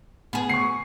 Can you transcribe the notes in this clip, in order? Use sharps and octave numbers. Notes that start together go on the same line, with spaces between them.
B3 G#4
C#6 C7